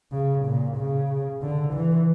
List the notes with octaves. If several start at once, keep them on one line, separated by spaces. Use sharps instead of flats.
C#3
A#2
C#3
D3
E3